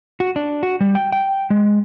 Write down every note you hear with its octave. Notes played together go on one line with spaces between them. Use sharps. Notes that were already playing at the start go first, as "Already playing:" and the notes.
F#4
D4
F#4
G3
G5
G5
G#3